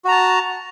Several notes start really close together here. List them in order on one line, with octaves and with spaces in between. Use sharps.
F#4 A#5 A5